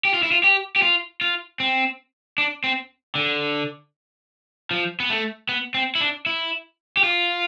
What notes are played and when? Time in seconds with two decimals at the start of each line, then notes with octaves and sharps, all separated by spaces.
0.05 G4
0.14 F4
0.23 E4
0.32 F4
0.44 G4
0.76 G4
0.82 F4
1.21 F4
1.60 C4
2.38 D4
2.64 C4
3.15 D3
4.71 F3
5.00 B3
5.10 A3
5.49 B3
5.74 C4
5.95 E4
6.00 D4
6.26 E4
6.97 G4
7.04 F4